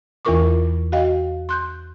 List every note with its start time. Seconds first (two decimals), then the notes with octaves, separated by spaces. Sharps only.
0.25 E2 E3 F4 A#4 C#6 D6
0.92 F#4 D#5 F5 G5
1.49 C6 F#6 G6